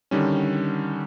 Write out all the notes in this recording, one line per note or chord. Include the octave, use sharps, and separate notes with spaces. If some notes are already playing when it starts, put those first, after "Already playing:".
D3 D#3 G3 C#4